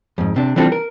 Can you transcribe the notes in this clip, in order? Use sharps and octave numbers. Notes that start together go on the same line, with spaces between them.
F2 G#2
C3 D4
E3 G3 C4 D4 F4 A4
A#4